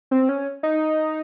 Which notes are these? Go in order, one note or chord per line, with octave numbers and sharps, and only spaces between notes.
C4
C#4
D#4